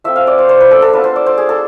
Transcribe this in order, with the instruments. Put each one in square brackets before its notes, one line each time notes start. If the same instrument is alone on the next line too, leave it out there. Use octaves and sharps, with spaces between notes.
[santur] F3 A3 C4 E5
F5
D5
C5
C5
B4
A4
A4
B3 D4 F4 B4
C5
D5
C5
G#4
A4